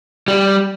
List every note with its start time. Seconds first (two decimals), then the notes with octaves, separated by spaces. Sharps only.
0.28 G3